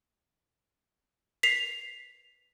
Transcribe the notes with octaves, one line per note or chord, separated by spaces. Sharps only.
B6 C7 F7